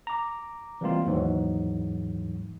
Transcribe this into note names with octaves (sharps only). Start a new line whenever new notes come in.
A#5 D6
E3 G3 G#3 A#3 C4 F4
D#2 G#2 E3 F#3